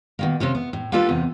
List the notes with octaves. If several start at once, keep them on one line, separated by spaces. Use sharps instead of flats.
B2 D#3 A#3
C3 A#3 C#4 G4
B3
A2
A#3 D4 F4 G4 A4 B4
E2 C3 D#4